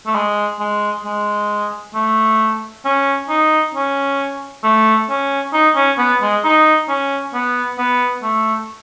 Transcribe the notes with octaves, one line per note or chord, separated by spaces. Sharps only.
A3
G#3
G#3
G#3
A3
C#4
D#4
C#4
A3
C#4
D#4
C#4
B3
G#3
D#4
C#4
B3
B3
A3